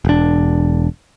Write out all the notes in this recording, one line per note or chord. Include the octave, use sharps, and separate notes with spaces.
E1 D4